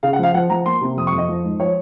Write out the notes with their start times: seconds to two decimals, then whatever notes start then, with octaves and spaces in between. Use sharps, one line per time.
0.03 C#3 F5
0.13 F#5
0.19 F3 F5
0.34 F3 F#5
0.50 F3 A#5
0.65 A#3 C6
0.81 C3
0.97 F2 D#6
1.07 C#6
1.12 F2
1.18 D#5
1.28 F3
1.44 G#2
1.59 F3 C#5